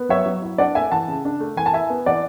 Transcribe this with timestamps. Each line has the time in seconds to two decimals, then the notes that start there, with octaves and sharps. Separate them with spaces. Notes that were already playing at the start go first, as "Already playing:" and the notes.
Already playing: B3
0.09 F#3 C#5 E5
0.26 F#3
0.42 E4
0.58 D4 D5 F#5
0.75 A3 E5 G#5
0.91 E3 F#5 A5
1.08 C#3
1.25 D4
1.40 A3
1.57 E3 G#5
1.66 A5
1.73 E4 E5 G#5
1.90 B3
2.06 E3 D5 F#5